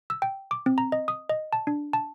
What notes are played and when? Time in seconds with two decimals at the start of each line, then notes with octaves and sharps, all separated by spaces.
0.10 E6
0.22 G5
0.51 D6
0.66 C4
0.78 A#5
0.92 D#5
1.08 D#6
1.29 D#5
1.53 A5
1.67 D4
1.93 A5